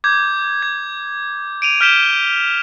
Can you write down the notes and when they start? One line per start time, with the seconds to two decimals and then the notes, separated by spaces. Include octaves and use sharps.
0.04 D6 G6 G#6
0.62 G#6
1.62 D7 D#7 F7
1.81 F6 G6 B6 D7 E7 G7